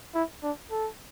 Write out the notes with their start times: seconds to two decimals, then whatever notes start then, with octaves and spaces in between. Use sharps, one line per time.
0.15 E4
0.43 D4
0.71 A4